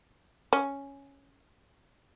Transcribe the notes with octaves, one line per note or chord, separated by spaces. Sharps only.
C#4